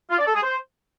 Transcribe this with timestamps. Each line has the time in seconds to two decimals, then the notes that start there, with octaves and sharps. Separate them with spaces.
0.10 F4
0.18 D5
0.26 A4
0.35 G#4
0.43 C5